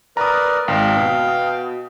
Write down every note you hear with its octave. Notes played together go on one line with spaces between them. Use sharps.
A#4 B4 D5 A#5 D#6
G#1 F5 G5
B2